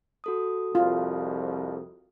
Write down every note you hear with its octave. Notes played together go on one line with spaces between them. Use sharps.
F#4 A4 D#6
C2 F2 F4